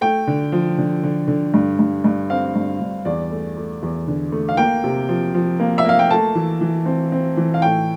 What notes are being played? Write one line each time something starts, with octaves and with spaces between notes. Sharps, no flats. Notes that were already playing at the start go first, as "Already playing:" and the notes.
A3 G5
D3
F3
D3
D3
D3
G2
G2
G2
C4 F5
G2
G2
E2 D5
A3
A3
E2
D3
A3
F5
A#3 G5
C3
F3
F3
A#3
E5
A#3 F5
G5
A3 A5
E3
E3
C4
C4
E3
F5
A2 G5